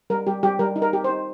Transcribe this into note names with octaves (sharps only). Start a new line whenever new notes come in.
G3 A#4
G3 G4
G3 G4
G3 A#4
D#4
A#4
G4
C5
D#4